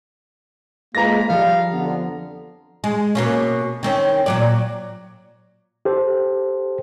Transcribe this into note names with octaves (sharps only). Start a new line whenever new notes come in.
F2 F3 G#3 A#3 B4 A#5 A6 A#6
F3 G3 A4 F5
F2 D3 B3
G#3
B2 A#3 C#4
D#3 C4 C#4
A#2 F#3 D5
G4 A4 C5